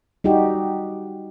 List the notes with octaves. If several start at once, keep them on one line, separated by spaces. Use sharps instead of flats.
G3 D#4 F#4 G4